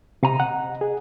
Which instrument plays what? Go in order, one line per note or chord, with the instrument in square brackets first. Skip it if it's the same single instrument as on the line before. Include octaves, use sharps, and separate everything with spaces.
[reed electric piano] C3 [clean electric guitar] D#5 A#5
[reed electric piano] F#5
G#4